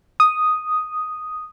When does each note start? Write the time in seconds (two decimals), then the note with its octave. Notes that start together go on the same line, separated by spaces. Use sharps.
0.20 D#6